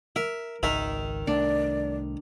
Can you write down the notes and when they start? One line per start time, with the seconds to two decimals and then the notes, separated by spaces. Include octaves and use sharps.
0.16 A#4 E5
0.63 G#1 C#2 D#3 E5
1.27 C2 A3 D4 D5